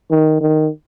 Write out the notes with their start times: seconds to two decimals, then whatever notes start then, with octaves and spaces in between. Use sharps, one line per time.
0.11 D#3
0.41 D#3